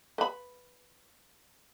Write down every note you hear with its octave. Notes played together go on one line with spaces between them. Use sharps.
B4 B5